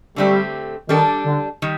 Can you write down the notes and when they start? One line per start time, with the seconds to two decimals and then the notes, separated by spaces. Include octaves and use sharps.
0.16 D3 G3 A3 C4 G4
0.88 D#3 G3 D4 A4
1.25 D3
1.62 D#3 G3